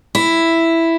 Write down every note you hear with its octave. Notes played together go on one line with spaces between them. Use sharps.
E4